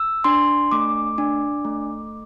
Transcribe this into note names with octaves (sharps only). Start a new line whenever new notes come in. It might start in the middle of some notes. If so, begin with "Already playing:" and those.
Already playing: E6
D4 C6
A3 D6
D4
A3